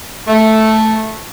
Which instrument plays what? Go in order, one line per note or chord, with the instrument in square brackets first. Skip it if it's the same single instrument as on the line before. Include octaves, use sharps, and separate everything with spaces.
[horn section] A3